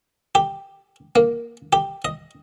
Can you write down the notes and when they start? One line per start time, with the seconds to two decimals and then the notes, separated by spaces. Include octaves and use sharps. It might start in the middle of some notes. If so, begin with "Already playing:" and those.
0.35 G4
1.16 A#3
1.73 G4
2.05 D#5